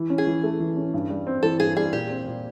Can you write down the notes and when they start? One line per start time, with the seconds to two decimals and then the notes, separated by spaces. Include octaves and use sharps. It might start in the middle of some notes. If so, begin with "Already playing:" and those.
Already playing: E3
0.10 C#4
0.18 G#4
0.27 E3
0.43 A3
0.60 E3
0.77 C#4
0.94 G2
1.10 G3
1.27 C4
1.43 E3 A4
1.60 G2 G#4
1.76 G3 G#4
1.93 A#2 G4
2.10 C4
2.26 A#2